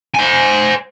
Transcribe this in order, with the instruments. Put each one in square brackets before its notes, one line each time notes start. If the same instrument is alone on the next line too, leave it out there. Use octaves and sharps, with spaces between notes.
[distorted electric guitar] C5 G#5